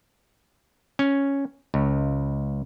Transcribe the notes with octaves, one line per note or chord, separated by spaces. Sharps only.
C#4
C#2